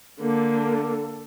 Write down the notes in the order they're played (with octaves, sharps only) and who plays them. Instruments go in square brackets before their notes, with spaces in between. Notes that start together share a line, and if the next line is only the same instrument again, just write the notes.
[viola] D3 A#3 [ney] A4